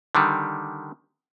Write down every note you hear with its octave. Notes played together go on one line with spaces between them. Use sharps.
D3 D#3 G3